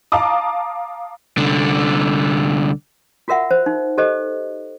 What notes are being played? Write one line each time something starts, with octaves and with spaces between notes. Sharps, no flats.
F5 A5 A#5 D6 D#6
C2 D3
F4 F#4 A#4 E5 F#5
C5
D#4
G4 A4 C5 D#5